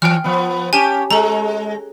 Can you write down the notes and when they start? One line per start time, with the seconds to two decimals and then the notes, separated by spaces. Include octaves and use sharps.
0.02 E3 G5 F6
0.24 F3 B3
0.73 C#4 G4 G#5 A5
1.11 G#3 A4 A#5